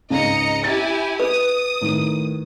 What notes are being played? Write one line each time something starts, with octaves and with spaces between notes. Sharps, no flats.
C#2 G#2 D#5 A#5 C#7
E4 G4 G#5 A6
B4 D#6
A2 D#3